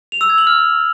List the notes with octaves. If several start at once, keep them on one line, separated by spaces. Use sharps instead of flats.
F7
E6
G#6
F#7
F6